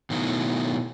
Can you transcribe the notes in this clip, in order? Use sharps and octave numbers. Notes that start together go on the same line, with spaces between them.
B2 D#3 F#3 A3 B3 E4